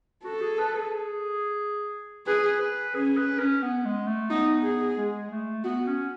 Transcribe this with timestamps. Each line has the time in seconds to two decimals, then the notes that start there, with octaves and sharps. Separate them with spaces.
0.24 F#4 A4
0.41 G#4
0.58 B4
0.75 G#4
2.27 G#4 B4
2.61 B4
2.95 C#4 G#4
3.17 B4
3.40 C#4
3.62 B3
3.85 G#3
4.07 A3
4.30 B3 D#4
4.63 G#4
4.97 G#3
5.31 A3
5.64 B3 F#4
5.87 C#4